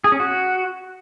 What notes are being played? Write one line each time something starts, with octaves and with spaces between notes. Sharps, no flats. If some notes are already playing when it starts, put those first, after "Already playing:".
G#4
C#4
F#4